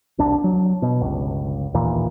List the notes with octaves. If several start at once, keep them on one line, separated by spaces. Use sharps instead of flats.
E1 C2 D4
F#3
B2
G1 C#2
A1 D#2 A#2 E3